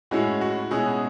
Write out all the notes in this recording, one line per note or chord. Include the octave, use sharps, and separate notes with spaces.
A2 G#3 C#4 E4 F#4
F#4
B2 G#3 C#4 E4 G#4